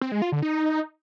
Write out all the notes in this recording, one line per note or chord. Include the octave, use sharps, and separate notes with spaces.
C4
G#3
F4
D3
D#4